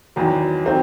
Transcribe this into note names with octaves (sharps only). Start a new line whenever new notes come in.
E2 D#3 F#3
D#3 F#3 C4